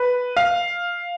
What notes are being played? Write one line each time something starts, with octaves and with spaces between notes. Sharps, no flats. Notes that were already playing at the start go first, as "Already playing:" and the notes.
Already playing: B4
F5